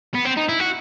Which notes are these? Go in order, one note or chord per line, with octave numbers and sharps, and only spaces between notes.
B3
C4
D#4
E4
F#4